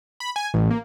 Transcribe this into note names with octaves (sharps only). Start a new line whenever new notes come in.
B5
G#5
A1
A#3